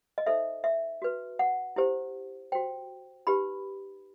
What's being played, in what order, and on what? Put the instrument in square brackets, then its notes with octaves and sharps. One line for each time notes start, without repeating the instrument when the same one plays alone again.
[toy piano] D#5
D#4 A4 C5 E5
E5
F#4 B4
F#5
E4 G4 C5
F#4 C5 G5
D#4 G4 B4 B5